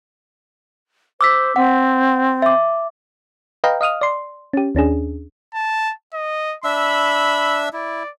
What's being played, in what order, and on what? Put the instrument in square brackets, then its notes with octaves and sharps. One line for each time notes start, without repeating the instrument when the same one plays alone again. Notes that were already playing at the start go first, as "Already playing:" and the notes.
[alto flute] C5 [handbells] D6 E6 B6
[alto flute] C4 [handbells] F#5
[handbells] E5 D6
[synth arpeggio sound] B4 D#5 F5 G5 A#5
D#5 F5 D#6 F6
D5 C6
C#4 G4
D#2 C#4 D4 G#4
[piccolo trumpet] A5
D#5
[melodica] D4 E5 E6 [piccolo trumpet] B5
[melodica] E4 [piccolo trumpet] D5